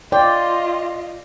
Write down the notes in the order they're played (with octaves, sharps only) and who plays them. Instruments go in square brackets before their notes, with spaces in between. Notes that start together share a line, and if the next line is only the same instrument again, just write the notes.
[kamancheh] F4 D#5 [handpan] D5 [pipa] G5 [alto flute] C6